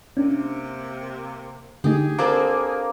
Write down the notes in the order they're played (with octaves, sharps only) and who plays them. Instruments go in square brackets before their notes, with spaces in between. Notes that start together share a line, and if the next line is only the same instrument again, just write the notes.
[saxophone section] C3 A#3 [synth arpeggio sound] C#4 D4
[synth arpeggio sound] D3 A3 D#4 [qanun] G4 [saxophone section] G#4
[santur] A#3 [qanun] C4 D4 A4